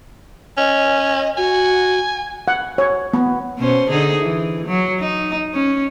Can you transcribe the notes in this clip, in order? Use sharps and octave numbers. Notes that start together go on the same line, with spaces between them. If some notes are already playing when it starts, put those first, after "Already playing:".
C#4 D#5
F#4 G#5
F#5
C#5
B3
B2 C#4 C5
D3 D#4 G#4
E3
F#3
D#4
C#4